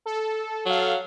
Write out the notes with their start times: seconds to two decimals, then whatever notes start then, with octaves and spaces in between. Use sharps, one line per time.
0.06 A4
0.65 F#3 A4 F5